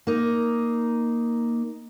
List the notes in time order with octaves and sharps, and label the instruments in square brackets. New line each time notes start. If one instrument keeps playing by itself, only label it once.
[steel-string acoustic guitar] A#3 D#4